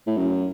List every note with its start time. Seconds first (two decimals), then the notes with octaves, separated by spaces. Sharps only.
0.06 A2
0.17 F#2